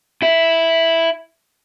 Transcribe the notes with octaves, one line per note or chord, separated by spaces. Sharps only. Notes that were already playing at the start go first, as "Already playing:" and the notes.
E4 E5